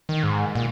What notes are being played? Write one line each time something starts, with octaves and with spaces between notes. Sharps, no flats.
D#3
G#2
A#2